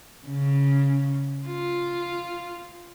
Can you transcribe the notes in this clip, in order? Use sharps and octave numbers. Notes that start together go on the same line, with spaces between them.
C#3
F4